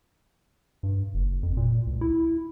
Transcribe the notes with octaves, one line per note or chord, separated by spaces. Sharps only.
G2
F#1
F2
A#2
C#2
E4